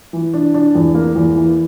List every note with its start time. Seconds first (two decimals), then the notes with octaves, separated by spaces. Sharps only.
0.13 E3
0.34 D4
0.54 D4
0.75 E2
0.95 A#3
1.15 E2
1.36 E3